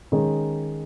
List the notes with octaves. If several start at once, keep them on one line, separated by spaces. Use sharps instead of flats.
D#3 G#3 C#4 G#4